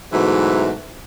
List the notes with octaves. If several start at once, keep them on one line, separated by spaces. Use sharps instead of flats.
G#2 B2 E3 F#3 A3